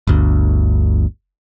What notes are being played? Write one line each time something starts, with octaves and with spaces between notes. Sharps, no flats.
G1 D2